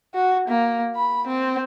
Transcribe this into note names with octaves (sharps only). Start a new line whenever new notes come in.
F#4
A#3
B5
C4